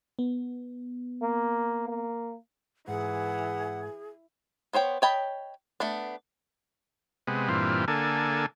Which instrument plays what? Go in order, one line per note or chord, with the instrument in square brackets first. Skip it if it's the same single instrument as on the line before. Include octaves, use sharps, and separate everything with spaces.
[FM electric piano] B3
[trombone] A#3
A#3
[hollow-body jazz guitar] G#2 [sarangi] E3 [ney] G#4 [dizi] F#5
[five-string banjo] B3 C5 C#5 G5
C#5 D#5 G5 A5 B5
A3 B3 D4
[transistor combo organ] C3 G#3 B3
G2 A#2 E3 C4 F4
D3 A#3 A4 G#5